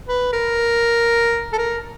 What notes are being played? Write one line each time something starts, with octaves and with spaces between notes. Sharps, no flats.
B4
A#4
A4
A#4